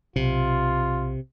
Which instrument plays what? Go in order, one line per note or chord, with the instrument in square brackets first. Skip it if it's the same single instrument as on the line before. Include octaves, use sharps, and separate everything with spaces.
[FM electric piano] B1 [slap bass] C3 [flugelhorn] F4